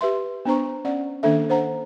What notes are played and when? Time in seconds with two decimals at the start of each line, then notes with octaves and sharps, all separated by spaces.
0.01 G4 B4 E5 C6
0.45 B3 D4 C5 A#5 C#6
0.85 C#4 D5 F#5
1.23 D#3 A#3 D4 A4 E5
1.49 D4 C5 F#5 A#5